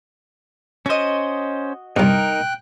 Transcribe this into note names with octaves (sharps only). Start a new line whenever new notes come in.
C#4 F#4 C5 D#5
C2 G2 D#4 A#4 G5 F#6